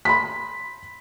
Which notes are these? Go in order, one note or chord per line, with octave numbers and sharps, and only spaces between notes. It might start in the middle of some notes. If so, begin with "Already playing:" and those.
B5 C6 B6